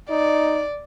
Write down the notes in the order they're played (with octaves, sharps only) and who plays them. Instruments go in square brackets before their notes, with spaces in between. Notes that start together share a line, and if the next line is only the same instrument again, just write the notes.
[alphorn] D#4 [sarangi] D5